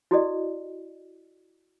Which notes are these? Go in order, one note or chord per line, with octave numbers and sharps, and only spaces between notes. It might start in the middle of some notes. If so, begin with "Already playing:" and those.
E4 F#4 G4 A4 D5 D#5